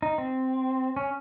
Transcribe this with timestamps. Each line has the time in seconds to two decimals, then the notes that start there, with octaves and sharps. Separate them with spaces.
0.02 D#4
0.18 C4
0.96 C#4